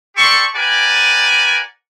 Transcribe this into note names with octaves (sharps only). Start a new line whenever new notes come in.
G4 A4 D5 C6 C#6
G4 A#4 B4 D5 F#5 G#5